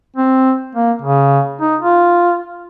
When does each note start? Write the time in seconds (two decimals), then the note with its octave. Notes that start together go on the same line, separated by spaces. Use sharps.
0.17 C4
0.75 A#3
1.02 C#3
1.61 D#4
1.82 F4